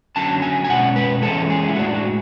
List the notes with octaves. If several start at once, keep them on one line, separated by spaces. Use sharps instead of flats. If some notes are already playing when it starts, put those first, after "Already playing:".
D3 F#3 C#4 A5
G#5
G#5
B2 G#3 C#4 F#5
B4
E3 G#3 C#4 A4
G#4
E4
A2 G#3 D4 F#4
F#4